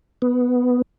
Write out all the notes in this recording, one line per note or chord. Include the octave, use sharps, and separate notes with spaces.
B3